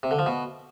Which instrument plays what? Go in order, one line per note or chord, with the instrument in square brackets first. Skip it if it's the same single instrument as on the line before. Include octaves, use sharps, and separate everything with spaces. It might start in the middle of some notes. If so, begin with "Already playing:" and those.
[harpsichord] C3
D3
F3
B2